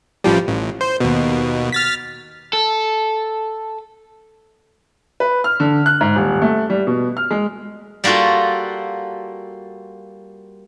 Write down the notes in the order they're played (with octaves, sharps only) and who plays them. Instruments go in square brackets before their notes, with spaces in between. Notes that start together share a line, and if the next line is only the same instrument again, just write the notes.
[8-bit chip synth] A1 F3 G3
A1
C5
D#2 B2
F6 A6 B6
[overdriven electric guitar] A4
[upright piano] B4
F6
D3
F#6
G#2
D#1
A3
G3
B2
F6
G#3
[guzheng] G3 A#3 F4 F#4 A4